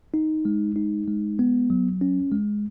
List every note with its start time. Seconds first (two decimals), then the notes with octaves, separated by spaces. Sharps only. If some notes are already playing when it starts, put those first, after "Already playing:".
0.14 D#4
0.45 G#3
0.76 D#4
1.08 G#3
1.39 B3
1.70 F#3
2.01 C#4
2.32 G#3